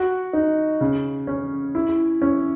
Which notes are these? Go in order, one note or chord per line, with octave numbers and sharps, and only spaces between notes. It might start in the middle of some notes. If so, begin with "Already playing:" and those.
Already playing: F#4
D#4
C#3
C#4
E4
C#4